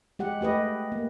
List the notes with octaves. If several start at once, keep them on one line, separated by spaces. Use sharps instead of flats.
G#3 G4 F#5
A3 G4 B4 D#5
A#3